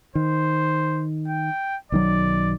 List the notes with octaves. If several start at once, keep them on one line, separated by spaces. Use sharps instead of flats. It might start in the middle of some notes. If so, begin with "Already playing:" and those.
D#3 C5
G5
B1 D#3 F#3 D5